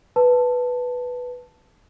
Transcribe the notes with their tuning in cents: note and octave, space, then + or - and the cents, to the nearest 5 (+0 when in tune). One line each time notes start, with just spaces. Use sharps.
B4 +0 A5 +5